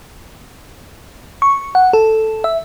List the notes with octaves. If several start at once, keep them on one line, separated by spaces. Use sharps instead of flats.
C#6
F#5
A4
E5